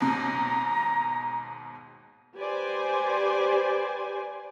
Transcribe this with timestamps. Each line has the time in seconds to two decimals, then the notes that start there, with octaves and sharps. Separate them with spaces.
0.01 D#2 G#2 B2 A#5
2.37 G4 B4 C5 D5 G#5